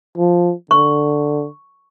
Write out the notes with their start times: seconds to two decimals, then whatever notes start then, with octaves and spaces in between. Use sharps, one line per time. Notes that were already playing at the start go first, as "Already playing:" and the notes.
0.18 F3
0.71 D3 C#6